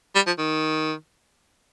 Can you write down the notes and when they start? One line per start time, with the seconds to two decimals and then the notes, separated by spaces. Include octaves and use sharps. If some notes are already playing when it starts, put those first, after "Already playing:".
0.16 G3
0.27 F3
0.38 D#3